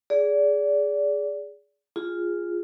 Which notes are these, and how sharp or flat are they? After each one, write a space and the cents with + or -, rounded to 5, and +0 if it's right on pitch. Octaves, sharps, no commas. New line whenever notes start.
G#4 +0 D5 -25
F4 +0 G#4 -15